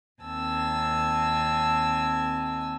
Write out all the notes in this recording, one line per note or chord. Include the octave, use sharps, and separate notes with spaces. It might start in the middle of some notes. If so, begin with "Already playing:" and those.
D#2 C4 G#5 A5 E6